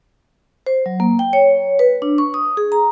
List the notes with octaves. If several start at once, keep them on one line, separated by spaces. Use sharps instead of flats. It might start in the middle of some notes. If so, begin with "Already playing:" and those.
C5
F#3
A#3
G5
C#5
B4
D4
C#6
D#6
G#4
A#5